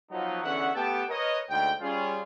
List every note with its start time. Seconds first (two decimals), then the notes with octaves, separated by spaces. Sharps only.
0.11 F3 F#3 B3 D#4
0.43 E2 D3 E3 C#4 E5 F#5
0.75 A3 B3 G4 F#5 G5 A5
1.09 A#4 B4 C#5 D#5
1.50 D2 G#2 G5
1.81 G3 C#4 F4 G#4